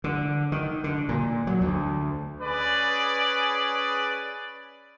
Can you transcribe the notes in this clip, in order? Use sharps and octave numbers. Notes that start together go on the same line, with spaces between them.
D3
D#3
D3
A#2
F#3
D2
C#4 G#4 B4 D5